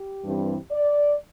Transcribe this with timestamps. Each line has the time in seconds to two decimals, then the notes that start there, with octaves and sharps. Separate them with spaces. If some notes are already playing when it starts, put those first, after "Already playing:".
Already playing: G4
0.25 G2 E3 G3 C4
0.71 D5